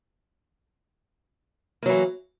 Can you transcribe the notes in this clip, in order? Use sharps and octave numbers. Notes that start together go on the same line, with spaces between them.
E3 F#3 A#3